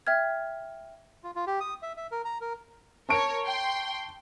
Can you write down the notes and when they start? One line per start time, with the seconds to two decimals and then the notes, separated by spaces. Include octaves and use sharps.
0.07 E5 G5 F6 G#6
1.24 F4
1.36 F4
1.47 G4
1.60 D#6
1.82 E5
1.97 E5
2.11 A#4
2.25 A#5
2.41 A#4
3.09 A#4 C#5 A5 C#6 D7
3.46 G5 C6